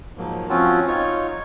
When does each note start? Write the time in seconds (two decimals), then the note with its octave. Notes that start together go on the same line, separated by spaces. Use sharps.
0.18 G#2 F3 F#3 A#3
0.49 F3 C4 C#4 F4 F#4
0.88 D#4 F4 C#5 C#6